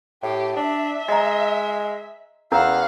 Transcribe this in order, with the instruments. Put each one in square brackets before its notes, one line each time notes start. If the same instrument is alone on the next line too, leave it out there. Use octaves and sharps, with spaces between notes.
[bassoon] A2 [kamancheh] G4
[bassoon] D4 [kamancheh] E5
[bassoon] G#3 [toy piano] D#5 A#5
[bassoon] E2 [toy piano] C#4 A#4 A#5 [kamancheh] F5 F#5